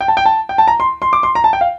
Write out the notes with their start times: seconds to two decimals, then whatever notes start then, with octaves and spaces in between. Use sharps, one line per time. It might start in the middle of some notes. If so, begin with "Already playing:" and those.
0.01 G5
0.08 A5
0.17 G5
0.25 A5
0.49 G5
0.58 A5
0.68 A#5
0.80 C6
1.02 C6
1.13 D6
1.23 C6
1.35 A#5
1.44 A5
1.53 G5
1.61 F5